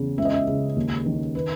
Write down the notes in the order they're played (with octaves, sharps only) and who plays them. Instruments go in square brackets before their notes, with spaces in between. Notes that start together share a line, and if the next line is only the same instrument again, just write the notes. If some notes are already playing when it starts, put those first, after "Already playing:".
Already playing: [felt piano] E2 C#3
C#2 E5
D#5
E5
C#3
D#2
D#3
B4